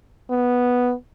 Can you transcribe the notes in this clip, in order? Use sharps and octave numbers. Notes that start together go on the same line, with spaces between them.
B3